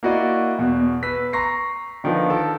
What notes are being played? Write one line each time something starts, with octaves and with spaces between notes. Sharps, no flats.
A#3 E4 F#4 D5 D#5
E2 B2
B4 E6 B6
A#5 C6 C#6 A#6 C7
D3 D#3 F3 D#4 F4 B4
A4